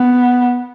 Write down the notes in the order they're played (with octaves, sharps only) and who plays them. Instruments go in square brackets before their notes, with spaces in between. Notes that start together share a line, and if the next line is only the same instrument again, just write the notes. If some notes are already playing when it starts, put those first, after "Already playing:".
Already playing: [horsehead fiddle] B3